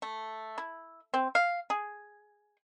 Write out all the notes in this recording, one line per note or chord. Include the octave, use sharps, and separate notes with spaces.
A3
E4
C4
F5
G#4